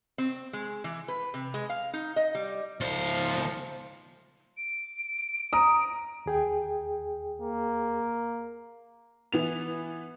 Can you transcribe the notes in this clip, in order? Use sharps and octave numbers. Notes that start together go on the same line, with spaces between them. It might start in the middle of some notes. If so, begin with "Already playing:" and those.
C4
G#3
E3
B4
C3
G#3
F5
D#4
D#5
G3
C#2 F3 C5
D7
A#5 D#6
D#2 G#4 G5
A#3
E3 B3 F7